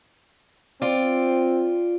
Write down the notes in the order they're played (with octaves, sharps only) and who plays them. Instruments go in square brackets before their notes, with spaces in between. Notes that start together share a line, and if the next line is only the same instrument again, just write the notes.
[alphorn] C4 [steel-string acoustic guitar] F4 D5